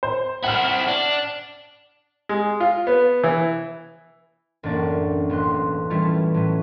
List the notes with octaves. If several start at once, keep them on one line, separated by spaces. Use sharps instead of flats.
C5
C4 E4 F#5 F6
D4
G#3
F4
B3
E3
A1 F#2 A#3 D4 D5 C#6
E1 A1 C6 F#6
E3 G3 A3 C#4 E4 F4
A2 F#3 B3